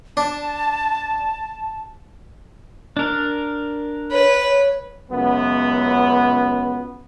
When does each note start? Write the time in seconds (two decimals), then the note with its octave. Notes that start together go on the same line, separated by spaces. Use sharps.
0.17 D4 A5
2.97 D4 A#4
4.11 B4 C#5
4.43 C#5
5.11 C#2 F#2 B3